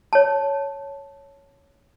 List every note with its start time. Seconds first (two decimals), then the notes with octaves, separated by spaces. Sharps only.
0.13 C#5 A5